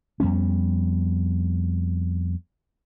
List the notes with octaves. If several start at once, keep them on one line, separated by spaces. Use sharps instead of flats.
F2 G3 B3 C#4